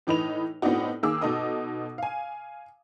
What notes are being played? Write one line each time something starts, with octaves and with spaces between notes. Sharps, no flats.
A2 E3 D#4 B4 F7
A2 B3 C4 D4 D#4 F#4
D#3 A#3 G#4 D6 E6
B2 D#4 A4 D#5 D#6
F5 G#5